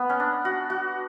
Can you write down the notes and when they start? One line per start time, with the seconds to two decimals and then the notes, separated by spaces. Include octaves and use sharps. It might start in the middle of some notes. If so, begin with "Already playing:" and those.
Already playing: B3
0.10 C#4
0.20 D4
0.45 F#4
0.70 F#4